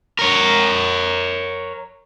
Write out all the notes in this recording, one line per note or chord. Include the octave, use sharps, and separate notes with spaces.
A#4 C#5